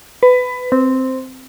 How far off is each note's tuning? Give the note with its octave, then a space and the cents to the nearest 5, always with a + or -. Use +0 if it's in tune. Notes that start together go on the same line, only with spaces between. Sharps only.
B4 +20
C4 -5